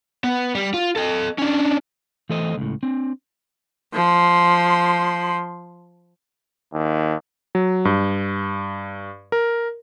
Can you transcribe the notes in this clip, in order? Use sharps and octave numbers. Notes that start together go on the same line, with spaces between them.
B3
G3
F4
A4 D#5
C#4 D4
E3 A3 A4 C5 D#5
C#2 A2
C4 D4
F3 C6
D#2
F#3
G2
A#4